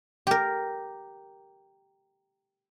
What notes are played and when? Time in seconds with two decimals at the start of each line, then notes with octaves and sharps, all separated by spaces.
0.27 G4 A#4